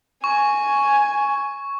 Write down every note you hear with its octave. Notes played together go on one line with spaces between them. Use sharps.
G#5 C#6